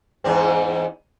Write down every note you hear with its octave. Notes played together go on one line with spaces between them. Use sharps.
E2 G#2 C4